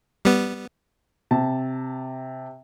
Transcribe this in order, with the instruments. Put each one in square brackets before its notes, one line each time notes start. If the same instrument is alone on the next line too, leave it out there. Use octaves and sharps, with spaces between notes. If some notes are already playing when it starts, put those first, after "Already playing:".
[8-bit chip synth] G3 B3
[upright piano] C3 A5